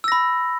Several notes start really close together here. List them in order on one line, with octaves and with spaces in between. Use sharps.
E6 A#6 B5